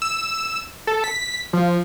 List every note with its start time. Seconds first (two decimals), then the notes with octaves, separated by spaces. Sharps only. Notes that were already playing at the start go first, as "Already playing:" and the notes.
0.02 E6
0.87 A4
1.04 B6
1.53 F3